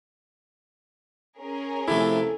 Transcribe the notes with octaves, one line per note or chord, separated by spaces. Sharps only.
C#4 G#4 A#4
C3 F3 A3 E4 A4